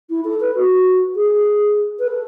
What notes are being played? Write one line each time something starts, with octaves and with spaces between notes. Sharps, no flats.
E4
A4
B4
F#4
G#4
B4
A4